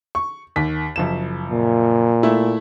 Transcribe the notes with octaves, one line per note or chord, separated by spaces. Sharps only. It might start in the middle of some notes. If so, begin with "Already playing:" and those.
C#6
D#2 B6
F#1 F3 E7
A#2
A3 E4